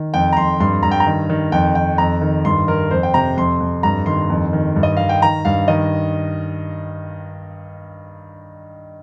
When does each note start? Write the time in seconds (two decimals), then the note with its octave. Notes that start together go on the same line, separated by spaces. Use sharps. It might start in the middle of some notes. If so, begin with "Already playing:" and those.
Already playing: D#3
0.14 F2 G5
0.32 A#5
0.37 F2 C6
0.60 G2 C6
0.83 G2 A#5
0.91 G5
1.00 A#5
1.07 D#3
1.30 D#3
1.52 F2 G5
1.75 D#3 G5
1.98 F2 A#5
2.22 D#3
2.45 G2 C6
2.68 D#3 A#4
2.91 F2 C5
3.03 G5
3.14 C3 A#5
3.37 F2 C6
3.60 F2
3.83 G2 A#5
4.06 D#3 C6
4.30 F2
4.53 D#3
4.76 G2
4.83 D#5
4.97 D#3 F5
5.09 G5
5.22 D#3 A#5
5.45 G2 F5
5.68 D#3 D#5